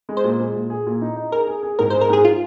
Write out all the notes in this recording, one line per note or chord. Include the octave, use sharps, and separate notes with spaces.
G#3
C5
A#2
G#3
A#2
G#4
A#2
D#4
D#4
G#4 A#4
G#4
G#4
G#2 A#4
G#3 C5
A#4
G#2 G#4
F4